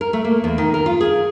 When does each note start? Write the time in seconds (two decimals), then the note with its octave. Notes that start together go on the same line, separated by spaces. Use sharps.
0.01 A#4
0.13 A3
0.25 A#3
0.44 E2
0.58 D#3
0.74 A#4
0.86 F4
1.01 G#4